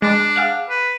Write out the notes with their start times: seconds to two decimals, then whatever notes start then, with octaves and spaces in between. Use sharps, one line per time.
0.02 G#3 D4
0.36 G#4 F5 F#5
0.70 B4